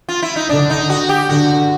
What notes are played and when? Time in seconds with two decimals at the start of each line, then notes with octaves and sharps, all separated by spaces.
0.09 F4
0.23 E4
0.36 D#4
0.49 D3 D4
0.70 D#4
0.90 F#4
1.09 G4
1.29 D3 F#4